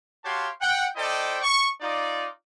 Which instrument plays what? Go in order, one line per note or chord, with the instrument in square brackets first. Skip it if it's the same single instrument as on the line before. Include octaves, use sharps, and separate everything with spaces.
[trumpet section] F#4 G4 C#5 F5 A5 C6
F#5 G5
E4 A4 C5 D5 D#5 G5
C#6
D#4 F4 D5